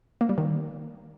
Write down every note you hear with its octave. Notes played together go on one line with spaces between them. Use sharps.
A#3
G3
D#3